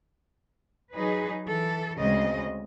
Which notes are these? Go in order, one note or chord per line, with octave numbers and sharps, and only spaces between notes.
F#3 D#4 G#4 B4
E3 A4
D2 C#3 G#3 C4 D#5